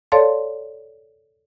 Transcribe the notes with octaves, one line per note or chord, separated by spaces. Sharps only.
A4 C#5 D5 F5 A5 C6